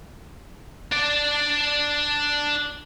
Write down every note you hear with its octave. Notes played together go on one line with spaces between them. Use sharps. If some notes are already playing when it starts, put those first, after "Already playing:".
D4 D5